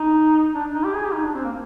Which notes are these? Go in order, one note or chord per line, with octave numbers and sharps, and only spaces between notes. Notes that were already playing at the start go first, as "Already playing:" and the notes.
Already playing: D#4
D4
D#4
G4
G#4
G4
D#4
D4
C4
A#3